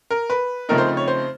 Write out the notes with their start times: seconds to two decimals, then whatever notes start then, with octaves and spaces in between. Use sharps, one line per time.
0.11 A#4
0.30 B4
0.69 C#3 F3 A3 C4 D#4 A#4
0.78 C5
0.97 C#5
1.08 C5